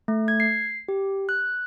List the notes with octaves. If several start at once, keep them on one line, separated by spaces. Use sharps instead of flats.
A3
G#6
C7
G4
F#6